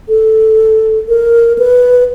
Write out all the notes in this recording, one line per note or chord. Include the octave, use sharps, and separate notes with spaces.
A4
A#4
B4